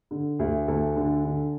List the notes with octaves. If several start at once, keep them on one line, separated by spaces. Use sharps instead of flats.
D3
D2
D2 A4
D3
D3